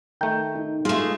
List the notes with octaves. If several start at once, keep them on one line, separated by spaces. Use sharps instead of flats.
D#3 A3 G5 A#5 G6
D#4
G#3 A3 F4